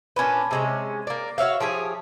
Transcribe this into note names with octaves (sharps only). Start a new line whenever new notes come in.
A#2 C#4 D4 B4
C3 G#3 C#4
A#3 D5
F#4 C#5 E5 F5
F3 G4 G#4 C#5